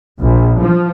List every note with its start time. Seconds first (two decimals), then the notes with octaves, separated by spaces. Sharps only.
0.20 A#1
0.62 F3